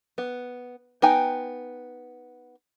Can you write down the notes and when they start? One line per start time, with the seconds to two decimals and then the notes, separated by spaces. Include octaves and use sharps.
0.18 B3
1.02 B3 D#4 G5 G#5 A#5